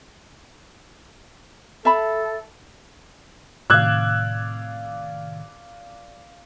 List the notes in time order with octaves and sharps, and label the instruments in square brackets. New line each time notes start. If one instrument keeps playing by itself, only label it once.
[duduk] A4 [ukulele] E5 A5 B5
[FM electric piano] A2 C3 D#3 [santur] D5 F5 [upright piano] E6 F#6 G#6